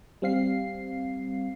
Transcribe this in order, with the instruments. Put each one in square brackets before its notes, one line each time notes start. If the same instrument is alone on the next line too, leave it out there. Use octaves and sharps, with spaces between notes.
[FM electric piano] G3 C4 F5 C7